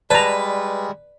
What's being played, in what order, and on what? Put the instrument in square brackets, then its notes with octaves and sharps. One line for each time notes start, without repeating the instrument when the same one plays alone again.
[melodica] G3 G#3 [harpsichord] B4 [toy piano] D5 [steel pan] A5 A#5